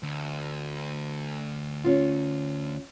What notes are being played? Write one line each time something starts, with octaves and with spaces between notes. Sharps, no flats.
D2
C#4 F4